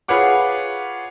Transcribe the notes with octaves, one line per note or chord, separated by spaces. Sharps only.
F4 G#4 B4 C#5 F#5 D6